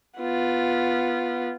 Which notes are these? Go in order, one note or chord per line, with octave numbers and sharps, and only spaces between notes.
B3 F4